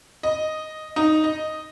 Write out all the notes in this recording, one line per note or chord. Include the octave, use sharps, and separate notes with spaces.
D#5
D#4
D#5